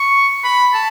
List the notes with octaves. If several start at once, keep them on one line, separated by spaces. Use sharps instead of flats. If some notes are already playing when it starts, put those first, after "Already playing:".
Already playing: C#6
B5
A5